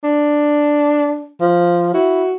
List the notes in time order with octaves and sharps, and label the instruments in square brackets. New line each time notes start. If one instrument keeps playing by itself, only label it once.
[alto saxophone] D4
[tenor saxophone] F3
[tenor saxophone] E4 [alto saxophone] F#4